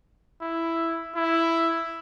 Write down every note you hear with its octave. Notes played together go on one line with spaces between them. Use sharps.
E4
E4